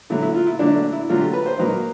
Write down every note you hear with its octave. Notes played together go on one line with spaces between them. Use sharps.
D3 F#3 A3 E4
E4
F4
E4
D3 F#3 A3 D4
D4
E4
D3 F#3 A3 F4
G4
B4
C5
D#3 F#3 A#3 B4